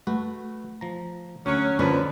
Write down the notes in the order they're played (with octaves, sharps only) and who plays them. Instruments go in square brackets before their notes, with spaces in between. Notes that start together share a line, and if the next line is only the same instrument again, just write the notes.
[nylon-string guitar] A3 [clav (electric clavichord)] F#4 B4
[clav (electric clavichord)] F3 A#5
[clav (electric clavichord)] D2 [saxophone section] F#3 C#4
[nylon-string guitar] D3 C#4 F4 [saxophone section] F3 B4 [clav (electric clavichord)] D4 A#4 G#5